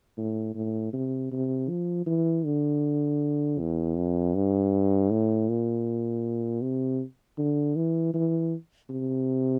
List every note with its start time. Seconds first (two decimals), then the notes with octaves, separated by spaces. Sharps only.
0.18 A2
0.55 A2
0.93 C3
1.32 C3
1.69 F3
2.07 E3
2.45 D3
3.59 E2
3.96 F2
4.35 G2
5.10 A2
5.49 A#2
6.62 C3
7.38 D3
7.76 E3
8.14 E3
8.90 C3